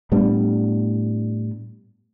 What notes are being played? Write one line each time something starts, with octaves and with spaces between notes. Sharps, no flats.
A2 G3 B3 D4